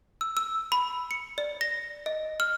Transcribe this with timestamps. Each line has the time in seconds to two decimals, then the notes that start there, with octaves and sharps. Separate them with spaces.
0.21 E6
0.37 E6
0.72 B5
1.11 C#7
1.38 D5
1.61 A#6
2.06 D#5
2.40 F6